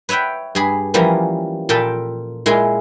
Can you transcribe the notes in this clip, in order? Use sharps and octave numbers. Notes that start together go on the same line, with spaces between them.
B4 C#5 E5 F#5 G5
G2 G#4 B5
E3 F3 G3 A#3 B3 C#4
A#2 F4 A4 G5 A5 B5
A#2 G#3 E4 F4 G#4